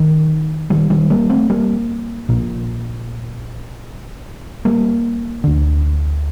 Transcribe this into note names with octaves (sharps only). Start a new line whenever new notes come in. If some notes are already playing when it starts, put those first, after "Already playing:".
Already playing: D#3
D#3 G3
D#3 G3
G3 A#3
A3 C4
G3 A#3
A#1 A#2
G3 A#3
D2 D3